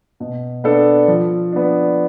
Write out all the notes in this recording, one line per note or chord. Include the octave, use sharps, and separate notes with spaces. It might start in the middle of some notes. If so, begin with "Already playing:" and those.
B2
B3 D4 A4
F3
B3 D4